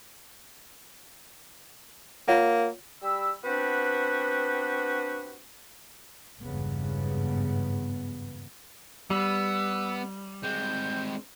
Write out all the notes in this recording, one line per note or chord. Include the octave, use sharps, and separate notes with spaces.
A#3 F4 C#5 F#5
G3 G4 B5 E6
B3 C4 D4 F#4 G4 B4
G#1 E2 G2 C#3 B3
G3 B3 E6
G#3 C4 G6